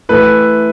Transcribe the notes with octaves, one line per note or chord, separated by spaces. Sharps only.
E3 A3 E4 B4